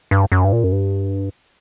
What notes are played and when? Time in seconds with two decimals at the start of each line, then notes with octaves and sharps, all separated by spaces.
0.11 G2
0.32 F#2
0.45 G2
0.52 A#2
0.64 F#2
0.72 G2